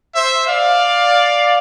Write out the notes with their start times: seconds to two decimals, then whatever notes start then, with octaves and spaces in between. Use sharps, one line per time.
0.14 C5 E5
0.47 D5 F5